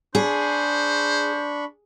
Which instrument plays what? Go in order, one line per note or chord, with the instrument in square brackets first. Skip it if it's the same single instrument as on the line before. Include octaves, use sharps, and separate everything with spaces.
[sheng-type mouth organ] D4 B5 C#6 [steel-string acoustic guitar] G#4 [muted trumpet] C5